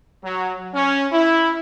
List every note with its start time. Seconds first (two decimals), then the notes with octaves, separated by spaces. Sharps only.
0.23 F#3
0.74 C#4
1.11 E4